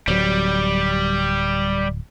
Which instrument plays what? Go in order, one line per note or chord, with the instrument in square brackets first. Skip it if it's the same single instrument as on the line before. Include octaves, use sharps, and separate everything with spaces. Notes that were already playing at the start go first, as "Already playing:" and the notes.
[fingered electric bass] D1 F#3 [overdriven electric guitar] G3